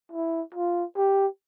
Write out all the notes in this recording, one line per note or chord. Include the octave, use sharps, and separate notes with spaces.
E4
F4
G4